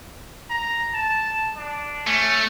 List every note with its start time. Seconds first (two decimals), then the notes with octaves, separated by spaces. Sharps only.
0.50 A#5
0.94 A5
1.57 D4
2.07 A3 C#4